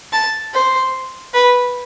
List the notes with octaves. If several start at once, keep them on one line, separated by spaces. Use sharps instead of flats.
A5
C5
B4